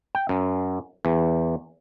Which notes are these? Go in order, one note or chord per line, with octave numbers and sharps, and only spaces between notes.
G5
F#2
E2